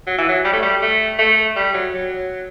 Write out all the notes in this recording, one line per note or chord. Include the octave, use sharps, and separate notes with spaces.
F#3
E3
F#3
G3
A3
G3
A3
A3
G3
F#3
F#3